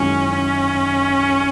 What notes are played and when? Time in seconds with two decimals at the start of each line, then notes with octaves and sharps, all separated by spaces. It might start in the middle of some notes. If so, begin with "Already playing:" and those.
Already playing: F#2 D#3 G#3 C#4 E4
0.35 C#4